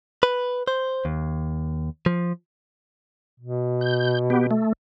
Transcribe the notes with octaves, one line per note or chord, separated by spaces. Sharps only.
B4
C5
D#2
F3
B2
G6
B3 G4
A3